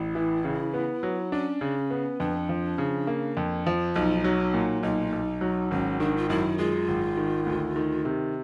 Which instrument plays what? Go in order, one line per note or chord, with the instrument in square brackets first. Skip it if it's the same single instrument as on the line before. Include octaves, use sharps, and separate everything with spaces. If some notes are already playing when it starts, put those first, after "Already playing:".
Already playing: [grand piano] A1 [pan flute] E4
[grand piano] E3
C#3
B3
F#3
[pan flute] C#4 [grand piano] D4
[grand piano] C#3
B3
[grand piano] F2 [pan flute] D4
[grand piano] F3
C#3
A#3
F2
F3
[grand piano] B1 [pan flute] D#4
[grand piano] F#3
A#2
[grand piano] B1 [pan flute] D#4
[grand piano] B1
F#3
[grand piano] G#1 [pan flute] C#4
[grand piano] D#3 [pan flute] D4
[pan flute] F4
[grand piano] F#2 [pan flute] E4
[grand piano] G#3 [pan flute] F4
[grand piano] G#1
D#3
D2
D#3
C3